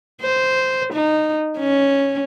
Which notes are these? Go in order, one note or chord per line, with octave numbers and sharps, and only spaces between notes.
C5
D#4
C#4